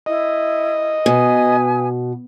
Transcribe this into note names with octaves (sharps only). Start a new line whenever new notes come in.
E4 D#5
B2 B4 G#5 D#6